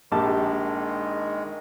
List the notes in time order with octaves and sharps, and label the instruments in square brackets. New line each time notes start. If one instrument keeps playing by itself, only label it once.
[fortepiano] A#1 G4 A5 [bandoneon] D#3 G#3